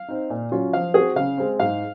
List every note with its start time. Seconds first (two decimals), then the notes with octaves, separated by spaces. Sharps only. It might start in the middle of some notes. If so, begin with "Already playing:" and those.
Already playing: F5
0.08 C4 D#4
0.30 A#2
0.52 F#3 C#4 F4
0.73 F3 F5
0.94 C4 F#4 G#4
1.16 C#3 F5
1.37 G#3 C4
1.60 G#2 F5